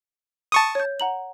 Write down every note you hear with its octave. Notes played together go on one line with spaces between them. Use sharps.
A5 C#6 D#6
C#5 G6
F#5 A#5 F#7